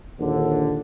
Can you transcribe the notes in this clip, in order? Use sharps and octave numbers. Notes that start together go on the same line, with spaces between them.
A#1 D#2 D3